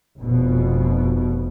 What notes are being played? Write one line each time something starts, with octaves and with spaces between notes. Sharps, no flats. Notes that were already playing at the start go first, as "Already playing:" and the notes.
F1 B2